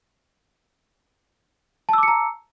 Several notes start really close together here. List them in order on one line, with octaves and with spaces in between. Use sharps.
A5 E6 D6 C#7 A#5